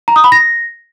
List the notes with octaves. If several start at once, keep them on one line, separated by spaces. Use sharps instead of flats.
A#5
D#6
B5
A#6